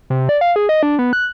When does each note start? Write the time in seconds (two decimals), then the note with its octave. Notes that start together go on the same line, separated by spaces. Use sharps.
0.10 C3
0.29 D5
0.41 F5
0.56 G#4
0.69 D#5
0.83 D4
0.99 B3
1.13 F#6